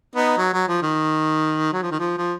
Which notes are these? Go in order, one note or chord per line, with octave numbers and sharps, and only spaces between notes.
B3 D#4
F#3
F#3
F3
D#3
F#3
F3
D#3
F3
F3